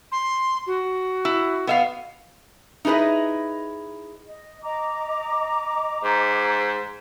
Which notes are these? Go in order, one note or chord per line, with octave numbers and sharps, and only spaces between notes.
C6
F#4
E4
B3 E5 F5
D#4 E4 G#4 B4 D#5
D#5
D#5 A#5 D6
G#2